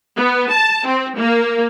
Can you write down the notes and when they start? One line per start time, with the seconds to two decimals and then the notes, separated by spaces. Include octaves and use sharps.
0.17 B3
0.51 A5
0.86 C4
1.17 A#3